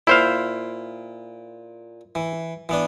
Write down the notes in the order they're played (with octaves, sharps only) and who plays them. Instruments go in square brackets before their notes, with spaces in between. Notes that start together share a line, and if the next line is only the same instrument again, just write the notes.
[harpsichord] A#2 [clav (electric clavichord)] E4 C5 F5
[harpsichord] E3
E3 B3 D4